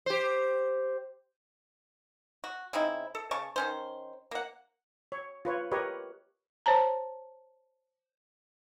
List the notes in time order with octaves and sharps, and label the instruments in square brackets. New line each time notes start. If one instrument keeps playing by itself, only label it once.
[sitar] G4 C5
[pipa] F#4
C#3 C4 D#4 E4
A4
C#3 A5 C#6
D#3 C#4 C5
A#3 F#5
[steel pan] C#5
F4 B4 C#5
G4 A#4 B4 C#5 D#5
[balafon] C5 C#5 A5 A#5